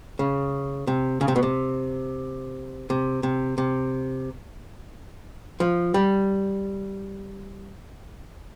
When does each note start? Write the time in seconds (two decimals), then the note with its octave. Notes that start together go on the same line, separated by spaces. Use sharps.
0.19 C#3
0.87 C3
1.21 C#3
1.28 C3
1.36 B2
1.43 C3
2.90 C3
3.23 C3
3.58 C3
5.60 F3
5.94 G3